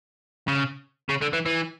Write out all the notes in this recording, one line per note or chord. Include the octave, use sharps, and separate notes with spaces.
C#3
C#3
D3
E3
E3